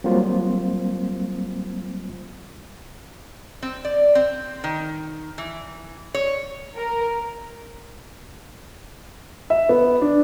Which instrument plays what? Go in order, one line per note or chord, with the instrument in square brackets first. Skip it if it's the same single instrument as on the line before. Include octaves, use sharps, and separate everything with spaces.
[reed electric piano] F#3 G3 A#3 C4 F4 C5
[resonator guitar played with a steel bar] C4
D5
C4
D#3
E3
C#5
[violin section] A#4
[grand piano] E5
B3
D4